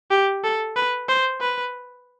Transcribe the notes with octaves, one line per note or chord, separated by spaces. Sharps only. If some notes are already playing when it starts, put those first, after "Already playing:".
G4
A4
B4
C5
B4